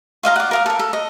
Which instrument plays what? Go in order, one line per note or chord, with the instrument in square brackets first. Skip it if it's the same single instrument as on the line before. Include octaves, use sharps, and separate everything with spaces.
[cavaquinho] F4 D#5 F5 A#5
D5 F#5
A#4 F5 D#6
A4 A#4
A4
D#5